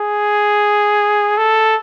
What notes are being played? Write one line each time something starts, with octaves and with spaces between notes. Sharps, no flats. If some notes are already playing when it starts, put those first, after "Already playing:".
Already playing: G#4
A4